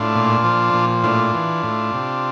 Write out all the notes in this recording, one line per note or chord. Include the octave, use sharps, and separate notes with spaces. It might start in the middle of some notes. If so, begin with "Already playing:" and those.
Already playing: A2 D4 F4
A#2
F3
A#2
A2 D4 F4
E3
A2
C3